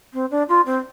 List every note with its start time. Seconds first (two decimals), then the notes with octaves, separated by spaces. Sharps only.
0.13 C4
0.30 D4
0.48 F4
0.65 C4